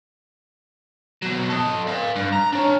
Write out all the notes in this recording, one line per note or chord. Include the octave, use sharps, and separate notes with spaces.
B2 F#3
A4 D#5
D5 F5
G2
A#5
D4 C#5